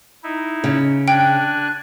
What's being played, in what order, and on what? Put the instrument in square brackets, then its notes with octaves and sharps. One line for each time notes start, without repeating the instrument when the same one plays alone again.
[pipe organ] D#4 E4
[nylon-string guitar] C#3
[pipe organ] D4 G#5 F#6 [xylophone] G5